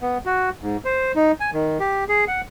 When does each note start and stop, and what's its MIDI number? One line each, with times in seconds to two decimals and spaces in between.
0.01 0.18 59
0.26 0.50 66
0.62 0.77 44
0.85 1.12 72
1.15 1.32 63
1.40 1.50 80
1.53 1.78 51
1.80 2.04 67
2.09 2.25 68
2.28 2.41 78